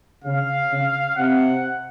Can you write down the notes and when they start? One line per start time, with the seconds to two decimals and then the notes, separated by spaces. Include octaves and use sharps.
0.24 C#3 F5
0.70 C#3
1.16 C3 F#5